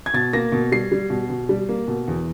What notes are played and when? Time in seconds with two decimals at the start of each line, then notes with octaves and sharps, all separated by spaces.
0.06 G#6
0.13 B2 A6
0.33 A#3 A#6
0.52 B2
0.72 G3 C7
0.92 G3
1.10 B2
1.30 B2
1.49 G3
1.69 A#3
1.88 B2
2.08 E2